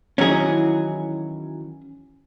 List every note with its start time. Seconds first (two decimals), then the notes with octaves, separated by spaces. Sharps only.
0.18 D#3 E3 F#3 C#4 G#4